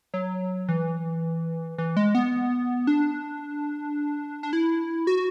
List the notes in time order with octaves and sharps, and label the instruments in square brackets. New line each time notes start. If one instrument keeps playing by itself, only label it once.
[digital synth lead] F#3
E3
E3
G#3
B3
D4
D4
E4
F#4